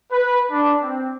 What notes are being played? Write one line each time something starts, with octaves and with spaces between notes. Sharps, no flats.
B4
D4
C4